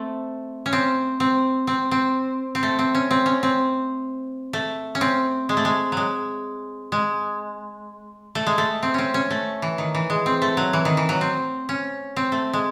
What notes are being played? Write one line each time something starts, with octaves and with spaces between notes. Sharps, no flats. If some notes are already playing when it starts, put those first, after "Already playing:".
Already playing: A3 C4
C#4
C4
C4
C4
C4
C4
A3
C4
C#4
C4
C#4
C4
A3
C#4
C4
G#3
A3
G#3
F#3 G#3
G#3
A3
G#3
A3
C4
C4 C#4
C#4
A3
E3
D#3
E3
G#3
C4
A3
F#3
E3
D#3
E3
F#3
C4
C#4
C4
A3
G#3